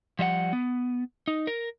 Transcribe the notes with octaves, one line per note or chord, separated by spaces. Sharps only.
F3 G3 E5 F#5
B3
D#4
A#4